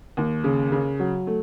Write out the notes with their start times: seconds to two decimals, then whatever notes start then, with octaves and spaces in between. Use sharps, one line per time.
0.17 D#2
0.44 C#3
0.72 C#3
0.99 F#3
1.27 A3